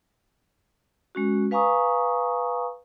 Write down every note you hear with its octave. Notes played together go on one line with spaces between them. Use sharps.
G#3 C#4 F#4
B4 F5 G#5 A#5 C#6 D#6